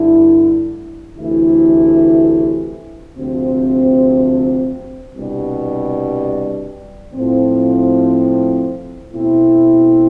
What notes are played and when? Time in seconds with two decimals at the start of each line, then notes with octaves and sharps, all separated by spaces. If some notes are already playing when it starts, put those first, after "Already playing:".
Already playing: G2 D3 A3 E4
1.17 D2 C3 E3 A3 E4
3.17 D2 C3 F3 C4
5.15 C2 B2 G3 D4
7.14 A2 F3 C4
9.13 B2 A3 C4 E4